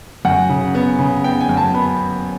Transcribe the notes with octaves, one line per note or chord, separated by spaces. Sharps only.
F#2 F#5
C#3
B3
C#3
B3 G5
G#5
F#2
A5
B3 B5